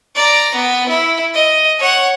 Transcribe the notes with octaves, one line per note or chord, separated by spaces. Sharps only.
D5 A#5
B3
E4
D#5
C#5 F#5